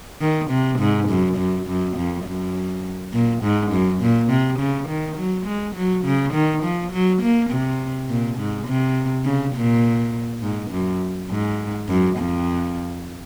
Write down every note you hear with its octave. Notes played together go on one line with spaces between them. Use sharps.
D#3
C3
G#2
F#2
F#2
F#2
F2
F#2
A#2
G#2
F#2
A#2
C3
C#3
D#3
F#3
G#3
F#3
C#3
D#3
F3
F#3
A#3
C3
A#2
G#2
C3
C#3
A#2
G#2
F#2
G#2
F#2
F2